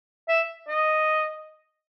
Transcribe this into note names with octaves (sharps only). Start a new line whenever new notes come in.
E5
D#5